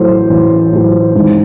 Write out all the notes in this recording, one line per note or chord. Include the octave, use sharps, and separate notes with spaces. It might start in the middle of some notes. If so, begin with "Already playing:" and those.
Already playing: A1 A2 F#3 A4 C5
A1
A2 F#3
G#1